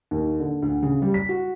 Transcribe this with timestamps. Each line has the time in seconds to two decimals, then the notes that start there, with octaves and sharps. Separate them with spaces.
0.11 D#2
0.40 D3
0.62 D2
0.83 C#3
1.02 G3
1.14 B6
1.29 F#4